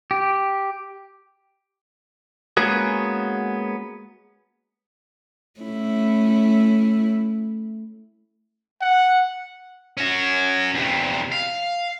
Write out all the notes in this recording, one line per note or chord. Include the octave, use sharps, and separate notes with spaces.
G4
G#3 A#3 B3 C#4 F#4 G#4
A3 C#4 E4
F#5
C#4 F#4
E2 C3
F5